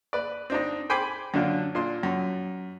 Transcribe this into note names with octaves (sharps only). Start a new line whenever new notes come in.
B4 D5
C4 D4 D#4
C5 G5 G#5 B5 C6 D6
F#2 D3 D4 F4
A#2 D4 C6
F#2